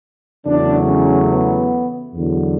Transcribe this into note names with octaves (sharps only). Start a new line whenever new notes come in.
E2 C#3 F#3 A3 D4
C#4
B3
E2 D3 F#3